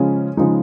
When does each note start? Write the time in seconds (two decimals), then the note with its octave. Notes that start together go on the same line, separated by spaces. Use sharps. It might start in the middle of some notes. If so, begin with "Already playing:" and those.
Already playing: C#3 F3 G#3 C#4
0.37 C#3 F3 G#3 D#4